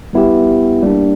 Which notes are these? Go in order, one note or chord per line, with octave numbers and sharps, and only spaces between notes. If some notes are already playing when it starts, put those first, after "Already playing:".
G3 B3 E4 G4
G3 A#3 D4